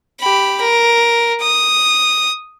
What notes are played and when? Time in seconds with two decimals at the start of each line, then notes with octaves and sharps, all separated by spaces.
0.20 G4 B5
0.60 A#4
1.41 D#6